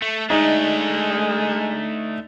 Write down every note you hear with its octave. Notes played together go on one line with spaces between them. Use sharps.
A3
G#3 A3 D4 D#4 D#5